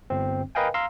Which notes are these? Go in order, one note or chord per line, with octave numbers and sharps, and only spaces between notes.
G1 C4
A#4 B4 D#5 F5 G5 G#5
F5 A#5 C6 E6